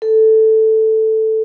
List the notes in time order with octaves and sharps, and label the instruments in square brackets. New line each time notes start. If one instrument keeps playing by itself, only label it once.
[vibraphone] A4